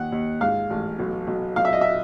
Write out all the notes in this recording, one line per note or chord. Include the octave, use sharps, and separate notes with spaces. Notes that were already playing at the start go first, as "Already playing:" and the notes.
Already playing: D#2 F#5
D#2
G#2 F5
A1
B1
B1
B1 F5
E5
D#5
E5